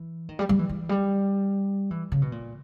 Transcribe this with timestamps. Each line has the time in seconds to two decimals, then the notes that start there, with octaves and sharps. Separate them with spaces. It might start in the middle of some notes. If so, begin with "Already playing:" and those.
Already playing: E3
0.29 D#3
0.39 G3
0.49 G3
0.59 E3
0.69 E3
0.89 G3
1.91 E3
2.12 C#3
2.22 B2
2.32 A#2